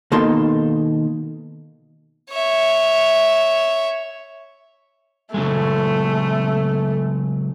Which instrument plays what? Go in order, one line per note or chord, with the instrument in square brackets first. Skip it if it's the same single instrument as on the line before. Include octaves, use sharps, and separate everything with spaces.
[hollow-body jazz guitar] B2 D#3 A#3 D#4 A4 C6
[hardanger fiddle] C#5 E5
[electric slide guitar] C#3 F#3 G#3 [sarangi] A3